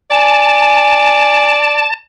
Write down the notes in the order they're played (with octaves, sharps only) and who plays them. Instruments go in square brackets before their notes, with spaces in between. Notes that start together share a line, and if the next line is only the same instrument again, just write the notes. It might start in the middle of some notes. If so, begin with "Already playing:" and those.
[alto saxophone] D5 [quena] G#5 [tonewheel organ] A5